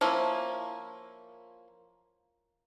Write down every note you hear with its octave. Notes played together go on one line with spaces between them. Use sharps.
F3 A#3 C#4 E4